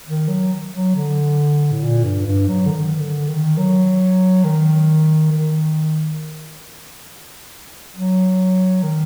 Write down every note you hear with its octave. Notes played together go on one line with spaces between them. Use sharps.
D#3
F#3
F#3
D3
A2
A#2
G2
G2
F#3
D3
D#3
D3
D#3
F#3
D#3
D#3
F#3
D#3